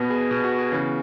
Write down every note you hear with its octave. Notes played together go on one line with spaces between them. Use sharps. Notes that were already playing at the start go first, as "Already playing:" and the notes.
Already playing: B2 B3
G#4
B2 B3
F#4
G#4
C#3 E3 B3 B4